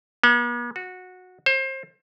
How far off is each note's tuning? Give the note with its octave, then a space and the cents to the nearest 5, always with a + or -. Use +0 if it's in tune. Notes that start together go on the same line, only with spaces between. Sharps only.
B3 -45
F#4 -15
C5 +30